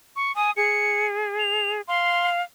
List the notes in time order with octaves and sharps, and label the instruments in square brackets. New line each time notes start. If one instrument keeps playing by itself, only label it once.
[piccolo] C#6
[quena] G#5 [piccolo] D#6
[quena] G#4 [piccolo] C#7
[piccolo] F7
[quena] F5 [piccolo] C6